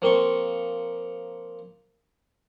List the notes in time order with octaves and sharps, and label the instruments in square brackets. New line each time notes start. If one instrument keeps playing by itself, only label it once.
[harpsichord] F3 A#3 C4 C6 C#6